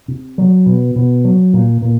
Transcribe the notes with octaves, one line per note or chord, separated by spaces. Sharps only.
C3
F#3
B2
B2
F#3
A#2
A#2